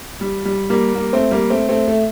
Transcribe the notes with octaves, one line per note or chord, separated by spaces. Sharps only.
G3
G3
G3 A#3
G3 A#3
A3 C4
G3 A#3
A3 C4
A3 C4
A3